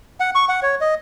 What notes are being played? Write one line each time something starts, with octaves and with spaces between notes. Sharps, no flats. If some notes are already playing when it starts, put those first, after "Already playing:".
F#5
C#6
F#5
C#5
D#5